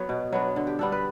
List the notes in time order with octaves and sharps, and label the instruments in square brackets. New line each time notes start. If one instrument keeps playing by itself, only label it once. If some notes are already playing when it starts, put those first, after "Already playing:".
Already playing: [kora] F#3 B3 B4 C#5
B2
F#3 B3 D4
D3
G4
G3 B3 D4 A4
B4